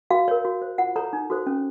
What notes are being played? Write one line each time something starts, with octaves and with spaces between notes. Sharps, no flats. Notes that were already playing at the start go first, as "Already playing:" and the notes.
F#4 F5
A#4 C#5
F#4
C5
F4 F#5
A4 C#5 A#5
D#4
F#4 A4 C5
C#4